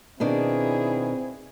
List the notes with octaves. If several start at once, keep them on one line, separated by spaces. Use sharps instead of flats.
B2 D#3 C4 D4 E4 G#4